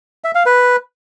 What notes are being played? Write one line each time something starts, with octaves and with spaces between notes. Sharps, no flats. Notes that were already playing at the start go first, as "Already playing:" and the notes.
E5
F5
B4